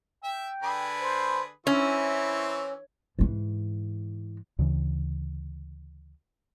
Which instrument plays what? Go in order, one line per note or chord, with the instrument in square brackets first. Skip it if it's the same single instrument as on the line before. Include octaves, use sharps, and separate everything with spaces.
[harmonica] E5 [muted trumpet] G5
[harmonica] D3 G#4 B4
[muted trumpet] C5
[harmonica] E3 C4 C#6 [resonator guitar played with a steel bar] C#4 [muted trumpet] E4
[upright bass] G#2 E3
[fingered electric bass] D2 C#3 E3